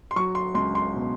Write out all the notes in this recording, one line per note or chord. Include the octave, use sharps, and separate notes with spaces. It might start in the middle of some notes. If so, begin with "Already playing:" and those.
C6
F#3 C#6
C6
C#2 C6
C6
B2